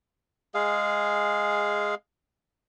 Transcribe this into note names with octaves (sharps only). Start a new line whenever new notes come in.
G#3 G#4 F5